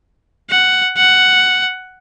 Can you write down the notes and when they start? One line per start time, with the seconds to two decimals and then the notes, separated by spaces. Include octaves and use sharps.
0.50 F#5
0.98 F#5